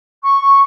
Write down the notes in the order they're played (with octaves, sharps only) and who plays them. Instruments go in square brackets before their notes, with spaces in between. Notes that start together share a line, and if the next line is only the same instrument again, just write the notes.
[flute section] C#6